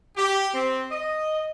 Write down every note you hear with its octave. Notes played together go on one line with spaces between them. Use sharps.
G4
C4
D#5